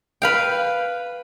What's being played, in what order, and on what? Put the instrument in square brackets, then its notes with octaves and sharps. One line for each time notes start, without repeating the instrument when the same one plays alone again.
[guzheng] B4 F5 G5